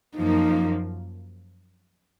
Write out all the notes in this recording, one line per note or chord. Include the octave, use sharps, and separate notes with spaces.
F#2 F3 A#3 D#4